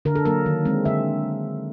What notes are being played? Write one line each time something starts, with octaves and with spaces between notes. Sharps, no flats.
D3 A#4
A4
F#3 A#3 A#4
D#3
G#3 C4
D3 E5